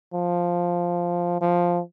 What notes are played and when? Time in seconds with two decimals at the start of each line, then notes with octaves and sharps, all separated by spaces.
0.14 F3
1.41 F3